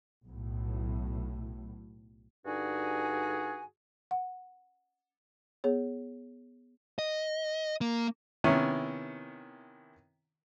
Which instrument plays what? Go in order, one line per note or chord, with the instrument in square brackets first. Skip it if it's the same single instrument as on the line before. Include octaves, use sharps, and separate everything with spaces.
[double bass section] B1 A2
[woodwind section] G2 D3 D#4 F#4 G#4 G#5
[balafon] F#5
B3 G#4 C#5
[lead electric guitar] D#5
A#3
[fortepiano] C3 D#3 B3 C#4 E4